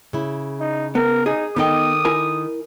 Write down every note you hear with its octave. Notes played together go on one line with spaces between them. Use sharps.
C#3 E4
D#4
B3 A#4
D#4 G#4
D#3 B3 D#4 A4 G5 D#6
E4 A#4 G#5